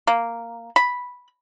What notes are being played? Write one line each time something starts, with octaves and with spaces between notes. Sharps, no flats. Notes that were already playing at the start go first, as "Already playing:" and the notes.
A#3
B5